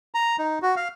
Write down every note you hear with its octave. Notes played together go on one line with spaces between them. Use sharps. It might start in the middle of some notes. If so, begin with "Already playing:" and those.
A#5
D#4
F#4
F5